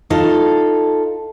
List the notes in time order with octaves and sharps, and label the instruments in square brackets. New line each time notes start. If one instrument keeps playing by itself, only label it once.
[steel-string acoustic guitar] D#4 F4 A4 F5